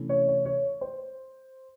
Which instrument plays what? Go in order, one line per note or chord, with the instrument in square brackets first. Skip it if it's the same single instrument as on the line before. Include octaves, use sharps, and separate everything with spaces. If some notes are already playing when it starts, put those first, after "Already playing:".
Already playing: [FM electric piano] C3 E3 A3 C#4 E4
[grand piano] C#5
C#5
C#5
C5